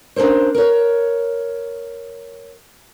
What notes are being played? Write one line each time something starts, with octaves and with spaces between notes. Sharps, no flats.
C#4 D4 A4 A#4 C5
A#4 C#5